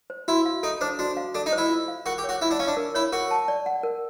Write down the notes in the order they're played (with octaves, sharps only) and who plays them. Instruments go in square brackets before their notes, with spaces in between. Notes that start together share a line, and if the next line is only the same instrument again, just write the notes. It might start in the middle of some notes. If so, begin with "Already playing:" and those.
[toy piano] C5
[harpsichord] E4 [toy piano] F#4
[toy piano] F5
[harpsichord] D#4 [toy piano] A4
[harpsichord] D4 [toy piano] C5
[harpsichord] D4 [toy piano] F#4
[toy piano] F5
[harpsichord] D4 [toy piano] A4
[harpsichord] D#4
[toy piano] C5
[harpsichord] E4
[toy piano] F4
F5
[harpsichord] F#4 [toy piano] A#4
[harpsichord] G4
[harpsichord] F#4 [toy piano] C#5
[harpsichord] E4 [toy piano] F4
[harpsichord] D4
[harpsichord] C#4 [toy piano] F5
[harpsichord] D4
[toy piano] A#4
[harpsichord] E4 [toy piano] C#5
[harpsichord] F#4 [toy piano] A#4
[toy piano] A5
D5
F#5
A#4